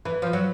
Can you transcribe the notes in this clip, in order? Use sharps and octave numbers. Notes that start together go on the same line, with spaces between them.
E3 B4
F3
F#3